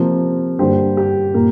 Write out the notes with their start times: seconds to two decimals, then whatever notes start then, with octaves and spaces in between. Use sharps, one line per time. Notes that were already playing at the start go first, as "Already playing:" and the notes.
Already playing: C3 F3 A#3
0.59 G2 D3 G3 A#3 G4 C5
0.97 G4
1.34 A#2 A#3